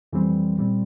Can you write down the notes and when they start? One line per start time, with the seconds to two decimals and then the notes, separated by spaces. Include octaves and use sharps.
0.13 F2 E3 G3 C4
0.58 A#2 G3 C4